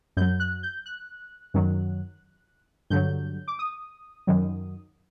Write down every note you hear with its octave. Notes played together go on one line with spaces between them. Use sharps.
F#2 F#3 G6
F#6
G6
F#6
F#2 D#3 F#3
G2 D3 F#3 G6
D6
D#6
F#2 D#3 F#3